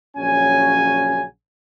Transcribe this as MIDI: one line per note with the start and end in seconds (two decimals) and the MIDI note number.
0.17 1.23 34
0.17 1.23 49
0.17 1.23 54
0.17 1.23 61
0.17 1.23 80